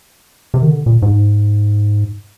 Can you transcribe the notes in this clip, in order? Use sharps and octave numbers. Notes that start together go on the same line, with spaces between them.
C3
D#3
D3
A#2
G#2